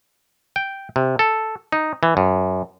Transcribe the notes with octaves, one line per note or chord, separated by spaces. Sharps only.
G5
C3
A4
D#4
E3
F#2